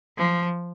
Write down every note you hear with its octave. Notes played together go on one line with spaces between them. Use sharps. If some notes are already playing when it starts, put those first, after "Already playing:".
F3